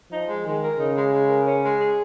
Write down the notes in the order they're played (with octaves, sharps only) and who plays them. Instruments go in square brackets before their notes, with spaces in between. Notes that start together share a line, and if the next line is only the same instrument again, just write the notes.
[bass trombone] F3 [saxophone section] D#4
[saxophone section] G#3
[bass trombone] D#3 [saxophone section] G#3
[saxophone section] A#4
[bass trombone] C#3 [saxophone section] D#4
[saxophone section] G#3
G#3
A#4
C#4
G#3
G#4